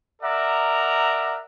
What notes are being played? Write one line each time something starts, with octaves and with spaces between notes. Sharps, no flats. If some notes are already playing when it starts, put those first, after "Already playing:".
A#4 D5 E5 F#5 A#5